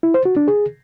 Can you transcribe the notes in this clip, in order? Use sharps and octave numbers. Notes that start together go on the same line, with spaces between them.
E4
C5
F#4
D4
G#4